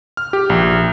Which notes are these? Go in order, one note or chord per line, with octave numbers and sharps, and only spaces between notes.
F6
G4
A#1